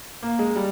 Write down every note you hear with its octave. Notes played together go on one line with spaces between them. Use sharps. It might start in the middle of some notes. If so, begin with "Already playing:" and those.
A#3
G#3
G3